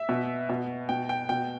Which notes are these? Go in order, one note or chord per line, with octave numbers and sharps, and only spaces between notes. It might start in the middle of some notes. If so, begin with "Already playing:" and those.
Already playing: E5
B2
B2
B2 G5
G5
B2 G5